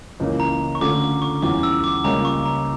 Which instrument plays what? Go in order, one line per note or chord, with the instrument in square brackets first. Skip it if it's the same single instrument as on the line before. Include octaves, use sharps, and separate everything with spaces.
[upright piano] C#2 C#3 E3 A#3
[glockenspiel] A#5
C#6
[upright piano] D3 A3 C#4 F4 [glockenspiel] D6
[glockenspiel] C#6
[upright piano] E2 E3 G3 C#4 F4 [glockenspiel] D6
[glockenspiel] E6
D6
[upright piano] C#2 C#3 G3 A#3 [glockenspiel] A#5
[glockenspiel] C#6
A#5